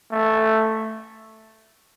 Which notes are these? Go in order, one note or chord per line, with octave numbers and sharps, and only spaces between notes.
A3